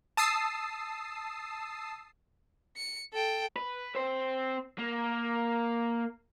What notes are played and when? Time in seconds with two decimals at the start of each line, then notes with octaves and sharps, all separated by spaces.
0.17 A5 D#6 E6 C7
2.76 C#7
3.13 A4 G5
3.56 B4
3.95 C4 C5
4.79 A#3